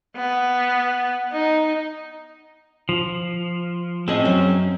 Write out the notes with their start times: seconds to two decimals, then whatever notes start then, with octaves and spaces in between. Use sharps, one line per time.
0.16 B3
1.32 D#4
2.89 F3
4.08 A2 C4 C#4 G#4 D#5
4.25 F#2 F#3